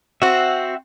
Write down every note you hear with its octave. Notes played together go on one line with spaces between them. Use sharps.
C4 F#4 E5 F#5